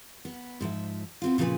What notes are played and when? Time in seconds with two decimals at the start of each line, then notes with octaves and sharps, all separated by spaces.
0.25 B3
0.61 G#2 F3 C5 E5
1.22 B3 C4 F4
1.38 A#2 C#3 F3 A4 B4 G#5